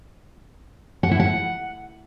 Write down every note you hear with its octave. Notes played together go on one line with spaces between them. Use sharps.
F#5
E4
F#5